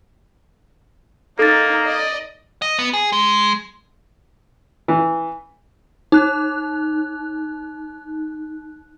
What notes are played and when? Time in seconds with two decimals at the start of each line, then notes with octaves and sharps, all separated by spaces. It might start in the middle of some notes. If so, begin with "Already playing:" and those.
1.39 A#3 D#4 A4 A6
1.87 D5 D#5
2.62 D#5
2.79 B3
2.94 G#4
3.12 G#3
4.88 E3
6.12 D#4 F#6